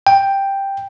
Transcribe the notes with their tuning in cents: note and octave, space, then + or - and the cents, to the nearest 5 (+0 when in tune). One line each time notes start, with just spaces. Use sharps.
G5 +5